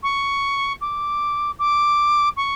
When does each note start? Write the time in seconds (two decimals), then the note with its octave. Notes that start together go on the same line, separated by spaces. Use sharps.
0.03 C#6
0.81 D6
1.59 D6
2.36 C#6